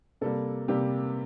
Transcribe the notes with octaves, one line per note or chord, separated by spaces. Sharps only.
C3 G3 A#3 A4
C3 G3 A#3 G4